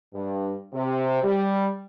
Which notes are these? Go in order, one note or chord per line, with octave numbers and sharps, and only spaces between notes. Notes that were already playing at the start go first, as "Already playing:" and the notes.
G2
C3
G3